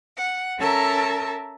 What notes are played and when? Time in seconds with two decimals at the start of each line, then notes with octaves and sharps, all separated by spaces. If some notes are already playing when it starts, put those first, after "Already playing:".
0.17 F#5
0.58 C#4 A4 A#4 E5 A5 A#5